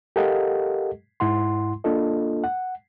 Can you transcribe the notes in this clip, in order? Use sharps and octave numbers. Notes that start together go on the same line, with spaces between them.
G4 A4 A#4 D#5 F5 F#5
G#2 E4 F#5 C6
A#3 D4 F4 A4 D#5
F#5